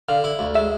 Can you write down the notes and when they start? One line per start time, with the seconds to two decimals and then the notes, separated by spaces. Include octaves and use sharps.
0.09 D3 F5
0.24 E4
0.39 D2
0.55 G#3 E5